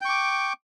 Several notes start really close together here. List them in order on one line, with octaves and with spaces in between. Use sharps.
G5 C#6 D6